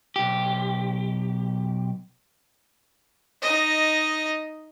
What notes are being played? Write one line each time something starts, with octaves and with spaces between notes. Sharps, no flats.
B1 G4
D#4 D#5